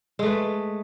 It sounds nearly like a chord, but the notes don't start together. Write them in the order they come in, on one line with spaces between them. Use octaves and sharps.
G#3 A3 B4